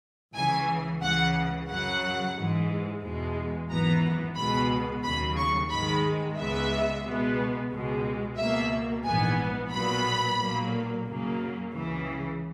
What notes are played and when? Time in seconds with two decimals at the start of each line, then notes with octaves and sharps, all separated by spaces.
0.34 C#2 C#3 E3 G#5
1.01 C#2 C#3 E3 F#5
1.69 F#2 C#3 F#3 F#5
2.35 G#2 E3 G#3
3.02 E2 B2 G#3
3.69 G#1 F#2 E3 B3 A#5
4.36 C#2 B2 G#3 B3 B5
5.03 D#2 C#3 F#3 B5
5.37 C#6
5.70 G#2 D#3 G#3 B5
6.37 C#2 C#3 G#3 B3 E5
7.04 C#2 B2 G#3 B3
7.71 C#2 B2 G#3
8.37 C#2 B2 A#3 E5
9.04 A#1 G#2 E3 B3 G#5
9.71 B1 A#2 F#3 B3 B5
10.38 B1 A#2 F#3 A#3
11.05 F#2 C#3 F#3 A#3
11.72 C#2 C#3 E3